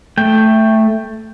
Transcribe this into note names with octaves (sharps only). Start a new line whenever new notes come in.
A3 G5